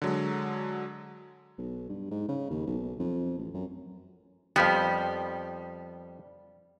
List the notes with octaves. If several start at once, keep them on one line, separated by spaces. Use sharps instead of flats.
D3 F#3 G#3
B1
G2
G#2
C#3
D#2
B1
F2
A1
F#2
F2 F3 G3 B3